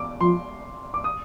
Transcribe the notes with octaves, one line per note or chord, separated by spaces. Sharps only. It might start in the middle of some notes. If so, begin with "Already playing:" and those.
Already playing: D6
F3 C6
D6
D#6